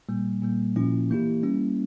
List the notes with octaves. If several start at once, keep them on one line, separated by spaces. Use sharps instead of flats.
A#2 G3 A#3
A#2 G3 A#3
A#2 F3 A#3 C#4 E4
E3 A#3 E4 G4
G3 A#3 C#4 E4